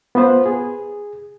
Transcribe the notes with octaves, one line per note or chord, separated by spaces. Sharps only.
B3 F4 B4 C5
G#4